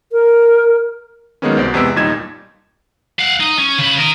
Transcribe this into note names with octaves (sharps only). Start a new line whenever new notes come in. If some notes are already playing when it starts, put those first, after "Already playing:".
A#4
D#3 F#3 G#3 A#3 B3 C#4
C2 B2 C5 D5
E2 C3 G#3 B3 E6 D7
D#2 A#2 G3 D#4 G#6 E7
F5 F#5
D#4
C#4
C#3 B4
A#4 D#5